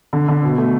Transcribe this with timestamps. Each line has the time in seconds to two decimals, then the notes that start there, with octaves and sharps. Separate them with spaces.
0.13 D3
0.28 D3
0.43 B2
0.58 A3